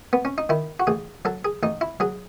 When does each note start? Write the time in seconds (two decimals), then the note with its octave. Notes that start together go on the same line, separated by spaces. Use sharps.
0.13 B3
0.25 C#4
0.38 D#4
0.49 D#3 E4
0.80 F#4
0.87 A1 G#4
1.25 F#3 A4
1.45 G#4
1.63 A1 D#4
1.81 E4
2.00 F#3 G#4